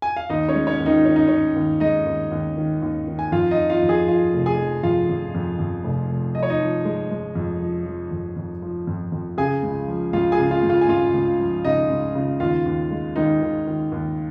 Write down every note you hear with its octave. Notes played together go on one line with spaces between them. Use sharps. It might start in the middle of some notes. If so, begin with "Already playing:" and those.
G#5
F5
D#2 D#4 D#5
C#4 C#5
G#3
C#4 C#5
D#2
D#3 D#4
D#3 C#4
D#4
D#3 C#4
D#2
G#3 D#4 D#5
D#2
D#2
D#3
D#2
D#3
G#5
F2 F4 F5
D#4 D#5
F3
F4 F5
F2
G#4 G#5
F3 F4 F5
F1
G#4 G#5
F3
F2 F4 F5
F2
F2
F2
F1
F1
F3 D#5
C#5
D#4 D#5
F3
G#3
G#3
F2
F3
F3
F2
F2
F3
F2
F2
C#3 G#4 G#5
C#2
F3
C#2 F4 F5
G#4 G#5
C#3
F4 F5
C#2
F4 F5
G#5
C#2 F4 F5
C#2
F3
C#3 D#4 D#5
C#2
C#3
D#2 F4 F5
D#2
G#3
D#3 G#3 D#4
D#3
D#3
D#2